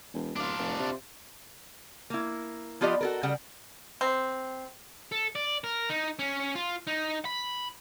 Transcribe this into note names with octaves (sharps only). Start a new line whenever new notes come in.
E1
D1 D4 F4
F1
C3
A#3 E4
F3 B3 F4 G4 D5 D#5
F#4 A4 A#4
C#3 G3 F#5 G5
C4
A4
D5
A#4
D#4
C#4
F4
D#4
B5